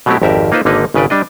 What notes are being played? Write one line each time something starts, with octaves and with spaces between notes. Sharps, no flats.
B2 F#3 A3 C4 E4 G4
G#1 F2 G4 A#4 E5
A#3 D#4 F4 B4 C5
G#1 D3 A#3 D#4 B4 D#5
G#1 C#3 B4 D5 G5
G3 D4 D#5